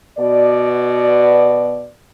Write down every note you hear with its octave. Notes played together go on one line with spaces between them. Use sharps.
B2 D5